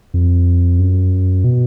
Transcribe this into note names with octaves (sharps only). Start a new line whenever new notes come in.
F2
F#2
B2